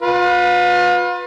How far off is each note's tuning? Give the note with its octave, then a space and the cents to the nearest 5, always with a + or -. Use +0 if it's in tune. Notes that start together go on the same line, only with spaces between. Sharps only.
F4 +35 B4 +0